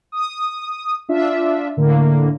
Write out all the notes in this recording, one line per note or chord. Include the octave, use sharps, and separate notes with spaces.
D#6
D4 F4 E5
A2 D3 A#3